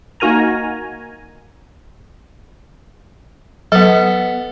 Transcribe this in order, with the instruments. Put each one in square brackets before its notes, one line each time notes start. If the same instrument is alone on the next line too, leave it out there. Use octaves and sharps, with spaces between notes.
[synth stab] A#3 D#4 F#4 A#4 G#5 A#5
[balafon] F#3 [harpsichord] B3 A4